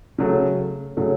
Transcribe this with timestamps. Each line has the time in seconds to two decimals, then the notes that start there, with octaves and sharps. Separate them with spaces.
0.18 C#3 F#3 A3
0.97 C#3 F#3 A3